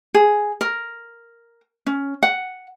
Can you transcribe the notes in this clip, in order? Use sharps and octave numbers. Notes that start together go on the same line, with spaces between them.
G#4
A#4
C#4
F#5